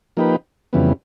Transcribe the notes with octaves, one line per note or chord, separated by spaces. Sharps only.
F3 A#3 D#4 G4 B4
F2 C#3 E3 G3 B3